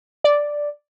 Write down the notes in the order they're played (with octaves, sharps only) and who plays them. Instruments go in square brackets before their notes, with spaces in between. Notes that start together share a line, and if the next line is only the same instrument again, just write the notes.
[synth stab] D5